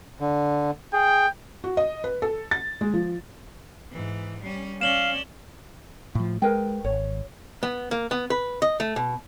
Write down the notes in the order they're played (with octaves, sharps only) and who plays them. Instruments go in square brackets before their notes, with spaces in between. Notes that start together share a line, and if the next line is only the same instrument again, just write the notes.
[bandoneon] D3
[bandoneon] G#4 [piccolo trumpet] G5
[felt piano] F#4
D#5
B4
A4
A6
G#3
F3
[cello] G#2 E3
G3 C#4
[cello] C#4 D5 [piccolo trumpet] F5 [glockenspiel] E7 F#7 G7
[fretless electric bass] A2 F3
[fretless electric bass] G#3 [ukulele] A#4 B4 G5
[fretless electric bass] G#1 [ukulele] C#5
[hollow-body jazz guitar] B3
A#3
B3
B4
D#5
A3
B2